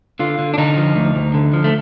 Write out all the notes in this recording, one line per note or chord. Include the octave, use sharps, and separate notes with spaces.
D3 F4
D3
D4
D3 D#4
F3
D2
D2
D3
F3
A3